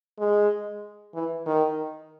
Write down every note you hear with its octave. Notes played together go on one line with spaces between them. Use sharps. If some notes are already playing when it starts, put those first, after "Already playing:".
G#3
E3
D#3